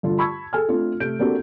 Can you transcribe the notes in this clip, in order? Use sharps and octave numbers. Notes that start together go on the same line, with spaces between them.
G2 D3 F4
A5 B5 C#6 E6 G#6
G#4 A4 G#5 F6
A3 C4 D4 F4
C3 A3 G6 D7
A#3 C4 D4 F#4 G4 A4